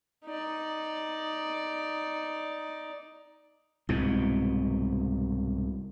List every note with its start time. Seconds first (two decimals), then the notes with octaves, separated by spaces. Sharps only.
0.25 D#4 D5
3.89 C2 G#2 B2